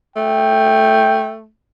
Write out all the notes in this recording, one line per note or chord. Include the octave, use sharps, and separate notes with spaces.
A3 G5